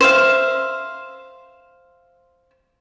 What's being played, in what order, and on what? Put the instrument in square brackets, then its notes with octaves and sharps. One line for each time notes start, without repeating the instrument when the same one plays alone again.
[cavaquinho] C5 E5 F5